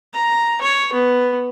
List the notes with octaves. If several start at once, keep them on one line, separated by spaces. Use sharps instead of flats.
A#5
C#5
B3